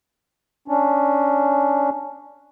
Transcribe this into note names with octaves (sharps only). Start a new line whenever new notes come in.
C#4 D4